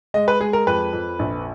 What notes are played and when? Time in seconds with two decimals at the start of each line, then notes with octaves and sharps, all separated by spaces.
0.14 G#3 D#5
0.28 B4
0.40 G#3 G#4
0.53 A#4
0.67 F2 B4
0.93 F2
1.19 A#1